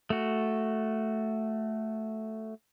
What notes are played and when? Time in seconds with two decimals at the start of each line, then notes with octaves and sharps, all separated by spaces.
0.10 A3 F#4